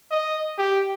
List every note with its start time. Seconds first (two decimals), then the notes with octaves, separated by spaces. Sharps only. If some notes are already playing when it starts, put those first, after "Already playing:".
0.11 D#5
0.58 G4